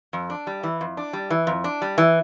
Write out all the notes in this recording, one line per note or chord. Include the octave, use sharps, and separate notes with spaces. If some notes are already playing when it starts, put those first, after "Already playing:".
F2
D4
G3
E3
F2
D4
G3
E3
F2
D4
G3
E3